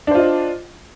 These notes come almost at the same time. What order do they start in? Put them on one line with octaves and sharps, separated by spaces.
D4 C5 F4 D#5